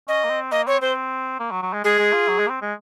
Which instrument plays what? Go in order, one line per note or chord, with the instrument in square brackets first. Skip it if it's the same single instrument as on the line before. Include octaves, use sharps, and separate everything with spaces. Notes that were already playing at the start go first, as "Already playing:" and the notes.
[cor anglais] C#4 [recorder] D#5
[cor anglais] A#3
C4
[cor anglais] A#3 [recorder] D#5
[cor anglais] C4 [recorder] C#5
[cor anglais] C4 [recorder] C5
[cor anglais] A#3
F#3
F#3
G#3
[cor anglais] G#3 [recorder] G#4
[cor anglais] G#3
F4
F#3
G#3
A#3
C4
G#3